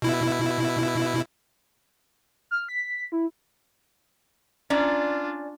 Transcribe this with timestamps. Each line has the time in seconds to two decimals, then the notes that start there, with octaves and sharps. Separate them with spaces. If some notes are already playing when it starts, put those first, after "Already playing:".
0.02 B2 E4
2.51 F6
2.69 B6
3.12 E4
4.70 C#4 D4 F4 D5 A#5